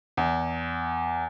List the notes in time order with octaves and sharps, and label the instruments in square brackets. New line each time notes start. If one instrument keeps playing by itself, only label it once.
[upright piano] E2